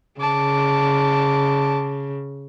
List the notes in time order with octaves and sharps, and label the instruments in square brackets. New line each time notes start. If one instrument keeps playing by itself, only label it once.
[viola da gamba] C#3 [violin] A5 D6